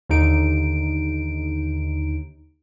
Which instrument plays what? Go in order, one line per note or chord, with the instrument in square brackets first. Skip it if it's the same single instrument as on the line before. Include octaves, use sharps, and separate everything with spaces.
[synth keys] D#2 D3 D#4 D7